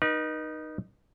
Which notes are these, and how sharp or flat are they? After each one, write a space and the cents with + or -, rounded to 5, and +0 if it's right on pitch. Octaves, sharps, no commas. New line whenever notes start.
D#4 -15 B4 -45